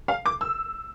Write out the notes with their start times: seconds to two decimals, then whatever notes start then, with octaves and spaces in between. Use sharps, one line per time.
0.08 F5
0.26 D6
0.41 E6